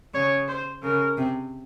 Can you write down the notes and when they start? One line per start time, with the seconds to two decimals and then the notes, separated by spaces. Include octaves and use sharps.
0.14 C#3 C#5
0.48 C5
0.83 C#3 A#4
1.18 C3